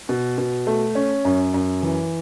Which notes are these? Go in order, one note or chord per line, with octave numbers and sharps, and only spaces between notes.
B2
B2
A3
C#4
F#2
F#2
E3